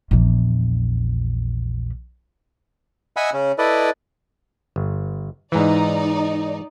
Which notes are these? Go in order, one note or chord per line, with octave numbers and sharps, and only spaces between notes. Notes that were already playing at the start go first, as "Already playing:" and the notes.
A#1 E2
D#5 E5 F#5 G#5 B5 E6
C#3 C#4
E4 A4 B4 D5 D#5
G1
G#2 E3 D#4 D5